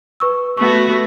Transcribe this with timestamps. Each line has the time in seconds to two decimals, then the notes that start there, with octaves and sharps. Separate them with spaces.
0.20 B4 C#6 E6
0.57 A3 B3 F#4 C#6